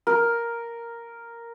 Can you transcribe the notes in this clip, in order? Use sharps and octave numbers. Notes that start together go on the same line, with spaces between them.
A#4